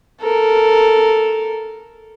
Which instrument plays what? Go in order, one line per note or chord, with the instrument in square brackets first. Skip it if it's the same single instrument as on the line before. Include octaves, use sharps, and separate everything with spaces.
[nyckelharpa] A4 A#4